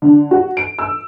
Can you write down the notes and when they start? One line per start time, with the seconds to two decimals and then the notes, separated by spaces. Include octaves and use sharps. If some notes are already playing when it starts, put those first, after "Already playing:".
0.02 D3
0.31 F#4
0.57 D7
0.79 E6